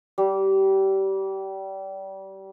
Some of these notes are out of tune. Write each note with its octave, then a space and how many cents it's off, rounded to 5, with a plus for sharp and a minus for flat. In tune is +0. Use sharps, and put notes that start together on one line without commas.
G3 -25